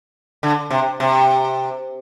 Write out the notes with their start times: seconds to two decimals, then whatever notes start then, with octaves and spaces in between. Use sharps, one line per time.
0.43 D3
0.70 C3
1.00 C3